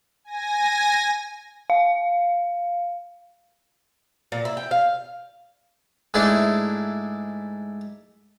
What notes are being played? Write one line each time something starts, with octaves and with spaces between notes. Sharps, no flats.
G#5 A#6
F5
A#2
E4
G5
F5
G#2 G#3 A3 D4 E4